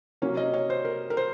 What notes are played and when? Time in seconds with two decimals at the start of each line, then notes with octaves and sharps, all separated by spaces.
0.22 C3 F#3 A#3 C#4 C#5
0.37 D#5
0.54 C#5
0.70 C5
0.85 A#4
1.10 A#4
1.17 C5